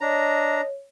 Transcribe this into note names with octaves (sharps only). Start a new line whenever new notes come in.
D4 C#5 D#5 A#5